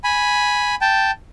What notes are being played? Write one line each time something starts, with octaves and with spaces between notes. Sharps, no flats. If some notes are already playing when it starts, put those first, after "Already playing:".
G#5 B5
G5 A5